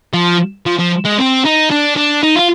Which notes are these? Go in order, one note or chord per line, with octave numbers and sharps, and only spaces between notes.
F3
F3
F3
G#3
C4
D#4
D4
D4
D#4
F4